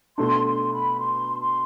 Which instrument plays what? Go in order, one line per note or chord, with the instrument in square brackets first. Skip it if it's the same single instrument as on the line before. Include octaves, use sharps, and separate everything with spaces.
[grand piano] B2 A3 D4 [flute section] C6
[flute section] C6
B5
C6
C6